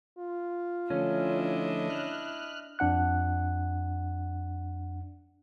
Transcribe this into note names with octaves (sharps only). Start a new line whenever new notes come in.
F4
D3 F3 A3 C#4 D4 E4 D#5
F6 F#6
F2 D4 F#5 F#6